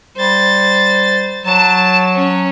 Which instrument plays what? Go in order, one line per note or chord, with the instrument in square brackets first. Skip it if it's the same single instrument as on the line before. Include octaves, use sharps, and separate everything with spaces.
[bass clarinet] G3 [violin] C5 A6
[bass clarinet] F#3 [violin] A5 E7
[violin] C#4